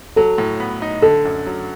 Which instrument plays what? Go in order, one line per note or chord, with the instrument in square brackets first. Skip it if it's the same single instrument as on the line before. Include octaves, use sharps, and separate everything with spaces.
[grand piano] F#3 [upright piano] A4
[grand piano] A2
B3
D#4
[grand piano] D3 [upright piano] A4
[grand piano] F#2
F#3